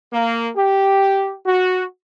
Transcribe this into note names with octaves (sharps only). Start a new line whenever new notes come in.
A#3
G4
F#4